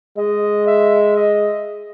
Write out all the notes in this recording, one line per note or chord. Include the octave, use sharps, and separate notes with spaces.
G#3 D#5
E5
D#5